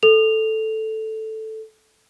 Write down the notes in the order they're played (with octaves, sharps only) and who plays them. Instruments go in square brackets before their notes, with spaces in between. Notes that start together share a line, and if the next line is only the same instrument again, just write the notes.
[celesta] A4 F7